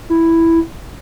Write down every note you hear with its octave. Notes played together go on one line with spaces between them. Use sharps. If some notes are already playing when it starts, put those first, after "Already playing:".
E4